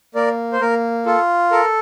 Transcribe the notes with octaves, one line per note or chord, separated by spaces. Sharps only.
A#3 A#4 D5
C5
A#3 A#4
F4 A4
A4 A#4